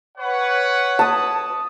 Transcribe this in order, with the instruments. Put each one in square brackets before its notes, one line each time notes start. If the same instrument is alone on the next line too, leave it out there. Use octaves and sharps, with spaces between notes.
[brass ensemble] B4 C#5 F#5
[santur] A5 D#6